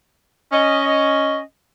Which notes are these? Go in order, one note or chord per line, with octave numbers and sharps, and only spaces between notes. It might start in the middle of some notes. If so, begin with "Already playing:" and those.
C#4 D#5